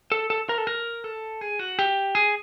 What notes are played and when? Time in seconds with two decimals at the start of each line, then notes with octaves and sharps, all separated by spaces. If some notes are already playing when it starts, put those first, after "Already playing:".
0.12 A4
0.30 A4
0.49 A#4
0.58 A4
0.67 A#4
1.04 A4
1.41 G#4
1.59 F#4
1.79 G4
2.15 G#4